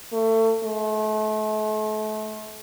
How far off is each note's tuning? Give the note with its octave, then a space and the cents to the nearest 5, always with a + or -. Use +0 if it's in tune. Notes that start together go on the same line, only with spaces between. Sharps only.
A3 +30
A3 -35